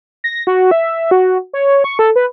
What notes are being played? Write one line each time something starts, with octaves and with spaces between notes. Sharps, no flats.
A#6
F#4
E5
F#4
C#5
C#6
A4
B4